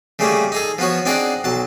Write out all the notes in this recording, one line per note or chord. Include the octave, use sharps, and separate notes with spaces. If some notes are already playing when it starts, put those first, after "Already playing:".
C#3 G3 A3 A#3 G#4
D#4 G#4 A4
F3 B3 F#4 C#5
C4 D4 D#4 G#4 D5 F#5
B1 F#3 A5